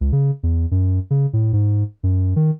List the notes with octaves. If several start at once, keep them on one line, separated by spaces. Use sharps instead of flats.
C#2
C#3
E2
F#2
C#3
A2
G#2
F#2
D#3